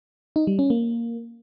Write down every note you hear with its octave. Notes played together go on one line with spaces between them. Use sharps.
D#4
G3
C#4
A#3